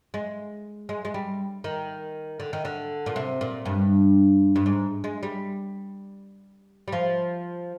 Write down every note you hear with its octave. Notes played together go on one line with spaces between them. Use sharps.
G#3
G#3
G#3
G3
D#3
D3
D#3
D3
A#2
C3
A#2
G2
G2
G#2
G#3
G3
G3
F3